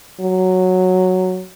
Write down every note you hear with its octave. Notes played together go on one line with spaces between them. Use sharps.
F#3